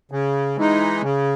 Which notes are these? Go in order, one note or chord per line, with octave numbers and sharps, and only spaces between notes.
C#3
E3 G#3 D#4
C#3